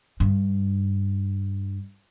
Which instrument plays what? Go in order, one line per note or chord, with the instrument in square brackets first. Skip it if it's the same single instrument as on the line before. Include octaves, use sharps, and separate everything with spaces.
[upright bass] G2 D4